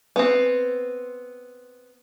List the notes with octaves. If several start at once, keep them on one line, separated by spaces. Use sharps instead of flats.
B3 C4